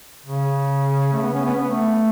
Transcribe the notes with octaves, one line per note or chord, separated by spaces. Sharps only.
C#3
A3
B3
C#4
B3
B3
A3